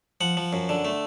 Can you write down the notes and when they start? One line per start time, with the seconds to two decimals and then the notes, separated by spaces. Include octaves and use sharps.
0.21 F3 F#5
0.37 F3
0.53 F#2
0.69 D3
0.85 A3